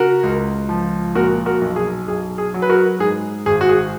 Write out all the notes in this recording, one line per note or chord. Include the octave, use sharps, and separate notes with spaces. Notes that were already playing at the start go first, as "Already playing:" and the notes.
Already playing: C#3 F#4 A#4
C#2
F3
A#2 F#4 A#4
F#4 A#4
B1
G#4
B1 G#4
G#4
F#3
B4
F#4 A#4
G#2 G#4
G#1 G#4
F#4
G#4